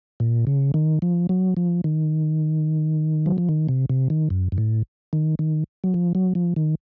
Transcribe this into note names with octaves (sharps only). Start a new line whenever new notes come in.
A#2
C#3
D#3
F3
F#3
F3
D#3
F#3
F3
D#3
C3
C3
D#3
F#2
F#2
A2
D#3
D#3
F#3
F3
F#3
F3
D#3